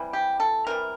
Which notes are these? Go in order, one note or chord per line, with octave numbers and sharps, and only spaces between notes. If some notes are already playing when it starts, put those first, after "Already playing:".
Already playing: C3 E3 G3
G4
A4
C3 E3 G3 A#4